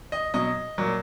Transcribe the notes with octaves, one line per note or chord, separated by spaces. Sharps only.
D#5
B2 F#3 D#5
A#2 F#3